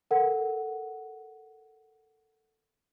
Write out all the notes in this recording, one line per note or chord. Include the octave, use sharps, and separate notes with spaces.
A4 A#4 F#5